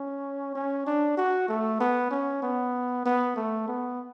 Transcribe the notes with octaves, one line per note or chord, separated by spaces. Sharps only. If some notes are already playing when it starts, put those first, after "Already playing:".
Already playing: C#4
C#4
D4
F#4
A3
B3
C#4
B3
B3
A3
B3